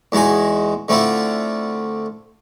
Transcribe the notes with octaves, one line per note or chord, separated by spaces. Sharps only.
E2 G#3 D#4 F#4 G#5
D3 A3 C4 E4 F4